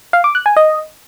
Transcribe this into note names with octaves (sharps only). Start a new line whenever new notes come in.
F5
D6
F#6
G#5
D#5